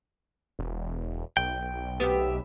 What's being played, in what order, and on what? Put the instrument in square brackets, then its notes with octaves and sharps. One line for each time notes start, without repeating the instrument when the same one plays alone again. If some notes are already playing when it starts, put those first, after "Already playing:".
[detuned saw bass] E1
[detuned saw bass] B1 [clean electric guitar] G5
[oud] B3 [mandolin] G4 E5